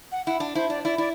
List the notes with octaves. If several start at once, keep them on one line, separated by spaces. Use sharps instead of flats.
F#5
E4 F#5
D4
E4 C5
D4 D5
E4 D5
E4 D5